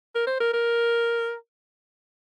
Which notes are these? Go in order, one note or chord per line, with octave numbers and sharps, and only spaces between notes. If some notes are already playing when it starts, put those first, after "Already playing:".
A#4
C5
A#4
A#4